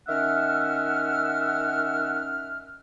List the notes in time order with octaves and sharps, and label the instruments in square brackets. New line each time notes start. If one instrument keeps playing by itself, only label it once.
[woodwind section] D#3 C#4 E5 F#5 E6 F6